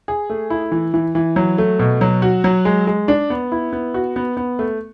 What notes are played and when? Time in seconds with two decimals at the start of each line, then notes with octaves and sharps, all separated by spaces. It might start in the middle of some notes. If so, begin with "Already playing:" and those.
0.08 G#4
0.30 A3
0.50 E4
0.72 E3
0.94 E3
1.15 E3
1.36 F#3
1.58 A3
1.79 B2
2.01 F#3
2.22 F#4
2.44 F#3
2.65 G#3
2.87 G#3
3.08 D4
3.30 B3
3.52 E4
3.73 B3
3.94 F#4
4.16 B3
4.37 B3
4.59 A3